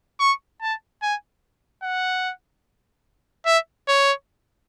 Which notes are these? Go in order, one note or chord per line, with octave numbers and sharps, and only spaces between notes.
C#6
A5
G#5
F#5
E5
C#5